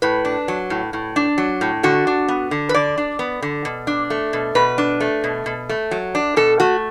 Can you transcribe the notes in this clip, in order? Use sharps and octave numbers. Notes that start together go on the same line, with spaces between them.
A2 B4
D4
F#3
A2
A2
D4
F#3
A2
D3 F#4
D4
B3
D3
B4
D3 D5
D4
B3
D3
B2
D4
A3
B2
B2 B4
D4
A3
B2
B2
A3
F#3
D4
B2 A4
A3 F#4